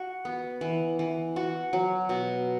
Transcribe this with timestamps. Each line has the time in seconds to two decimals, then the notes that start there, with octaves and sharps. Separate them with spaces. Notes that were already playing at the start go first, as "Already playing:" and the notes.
Already playing: F#4
0.25 B3
0.61 E3
0.99 E3
1.36 F#4
1.73 F#3
2.09 B2